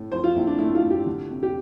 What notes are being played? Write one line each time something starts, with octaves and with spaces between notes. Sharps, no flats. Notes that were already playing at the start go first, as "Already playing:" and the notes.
Already playing: A2 A3
F3 C5
F4
A#1 E4
D4
A3 E4
F4
A2
G4
D3
F1
G4